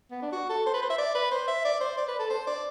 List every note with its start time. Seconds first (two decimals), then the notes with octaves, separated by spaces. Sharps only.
0.11 B3
0.22 D4
0.32 F#4
0.49 A4
0.66 C5
0.74 B4
0.82 C5
0.90 E5
0.98 D5
1.15 B4
1.31 C5
1.47 E5
1.65 D5
1.80 C5
1.97 D5
2.08 B4
2.19 A4
2.30 C5
2.47 D5